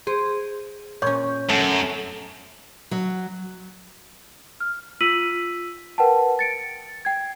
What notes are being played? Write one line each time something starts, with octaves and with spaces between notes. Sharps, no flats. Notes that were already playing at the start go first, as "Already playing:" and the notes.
G#4 C5
A#2 C#4 C#5 G6
F#2 A3
F#3
F6
F4 E6 B6 D#7 F#7
A#4 B4 F#5 G5 A5
A6 C#7 D7
G5 G#6